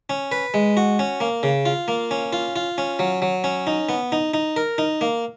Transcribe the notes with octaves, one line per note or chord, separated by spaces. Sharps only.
C#4
B4
G#3
F#4
C#4
A#3
C#3
F4
A#3
C#4
F4
F4
C#4
F#3
F#3
C#4
D#4
B3
D#4
D#4
A#4
D#4
A#3